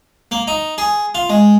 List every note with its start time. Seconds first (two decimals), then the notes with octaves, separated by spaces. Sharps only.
0.31 A#3
0.47 D#4
0.78 G#4
1.15 F4
1.30 G#3